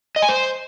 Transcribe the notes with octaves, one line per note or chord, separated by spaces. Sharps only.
D#5
G#5
C5